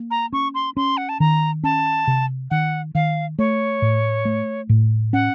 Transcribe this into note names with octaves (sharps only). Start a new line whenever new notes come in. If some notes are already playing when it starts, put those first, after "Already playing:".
Already playing: A#3
A#5
C#4 C#6
C6
C#4 C6
F#5
A5
D#3 A#5
C#4 A5
C3
D#3 F#5
D#3 F5
A3 C#5
A2
A3
A2
C#4 F#5